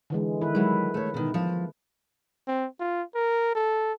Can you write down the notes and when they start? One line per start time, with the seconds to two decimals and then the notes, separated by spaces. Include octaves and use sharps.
0.10 D3 E3 G#3
0.41 D#3 E4 B4
0.55 F#3 G#3 E4
0.94 A3 C#5
1.14 B2 D#3
1.34 F3
2.48 C4
2.80 F4
3.15 A#4
3.55 A4